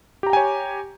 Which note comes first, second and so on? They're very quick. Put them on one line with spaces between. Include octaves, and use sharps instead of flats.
G4 A#5 G5 G#5 C#5